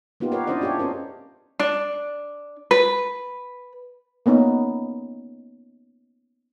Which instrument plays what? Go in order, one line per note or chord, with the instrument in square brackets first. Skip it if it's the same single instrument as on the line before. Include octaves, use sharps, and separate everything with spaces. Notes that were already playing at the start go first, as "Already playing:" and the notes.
[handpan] A#3 B3 D#4 F4 G4
G4 A#4 B4 C#5 F5
C#4 D4 E4 C5 D5 D#5
D4 F4 G4 G#4 C#5
C4 C#4 A#4 C5
[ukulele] D4
B4
[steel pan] A#3 B3 C#4 D#4